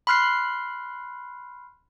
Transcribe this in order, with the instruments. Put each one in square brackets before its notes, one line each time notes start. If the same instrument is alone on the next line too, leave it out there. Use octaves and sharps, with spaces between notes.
[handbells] B5 C6 F6 F#6 C7